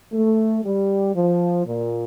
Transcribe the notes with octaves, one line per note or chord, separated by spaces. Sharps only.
A3
G3
F3
A#2